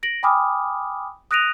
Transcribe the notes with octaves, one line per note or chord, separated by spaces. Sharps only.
A#6 D7 F#7
G5 G#5 B5 D6 D#6 F6
D#6 F#6 A#6 D7 D#7 F7